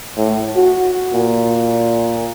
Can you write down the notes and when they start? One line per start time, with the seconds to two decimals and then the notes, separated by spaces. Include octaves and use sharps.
0.17 A2
0.56 F#4
1.13 A#2